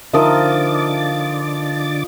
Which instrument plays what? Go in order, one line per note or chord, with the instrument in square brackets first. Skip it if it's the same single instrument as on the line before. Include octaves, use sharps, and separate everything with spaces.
[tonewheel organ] D3 D6 A6 [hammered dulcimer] F3 D#5 [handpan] D#4 A#4 E5